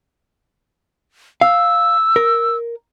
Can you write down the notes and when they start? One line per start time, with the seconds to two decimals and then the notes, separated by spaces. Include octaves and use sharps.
1.41 F5 E6
2.16 A#4